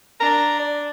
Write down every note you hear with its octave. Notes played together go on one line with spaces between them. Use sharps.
D4 A#5
D5